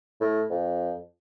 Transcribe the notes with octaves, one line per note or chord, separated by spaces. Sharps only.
A2
F2